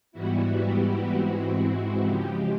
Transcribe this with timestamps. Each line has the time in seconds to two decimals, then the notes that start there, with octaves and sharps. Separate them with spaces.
0.12 G#2 E3 G3 B3 E4 F#4
0.61 G4
1.08 G#2 E3 G#3 C4 E4 F#4
1.56 F#4
2.04 C#3 F3 G#3 G4